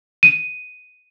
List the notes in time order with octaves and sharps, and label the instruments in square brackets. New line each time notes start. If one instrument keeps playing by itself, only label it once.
[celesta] D#7